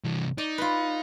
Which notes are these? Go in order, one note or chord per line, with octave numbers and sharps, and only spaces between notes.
C2 E3
D#4 D5
F4 B4